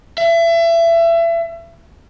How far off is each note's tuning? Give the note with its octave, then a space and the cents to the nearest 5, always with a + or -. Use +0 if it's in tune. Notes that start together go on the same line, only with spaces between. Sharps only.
E5 +30